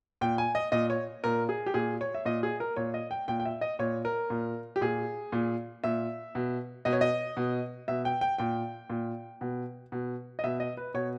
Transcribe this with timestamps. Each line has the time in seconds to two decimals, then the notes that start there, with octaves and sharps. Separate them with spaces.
0.21 A#2 G5
0.38 G#5
0.55 D#5
0.72 A#2 D#5
0.90 C#5
1.24 A#2 A#4
1.49 G#4
1.66 G4
1.74 A#2 G#4
2.01 C#5
2.14 E5
2.25 A#2 D#5
2.43 G#4
2.60 A#4
2.76 A#2 C#5
2.94 D#5
3.11 G5
3.28 A#2 G5
3.40 G5
3.45 E5
3.61 D#5
3.79 A#2 C#5
4.05 A#4
4.30 A#2
4.76 G4
4.81 A#2 G#4
5.32 A#2
5.84 A#2 E5
6.35 B2
6.85 B2 D#5
6.93 C#5
7.01 D#5
7.37 B2
7.88 B2 E5
8.05 G5
8.21 G5
8.38 A#2 G5
8.90 A#2
9.41 B2
9.92 B2
10.39 D#5
10.44 B2 E5
10.60 D#5
10.77 B4
10.94 B2 C#5